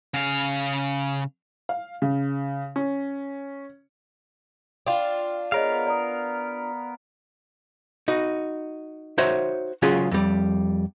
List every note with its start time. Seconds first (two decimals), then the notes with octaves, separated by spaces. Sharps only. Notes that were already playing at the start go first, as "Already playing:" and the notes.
0.14 C#3 F5
1.69 F5
2.02 C#3
2.76 C#4
4.87 D4 F4 G5
5.52 B3 G#4 A#4 C#5 D#5 F5
5.86 D5 A#5 D#6
8.08 D#4 F#4
9.18 D#4 F#4 C5 C#5 E5
9.82 C#3 F#3 C#4 F4 G#4
10.11 F2 G3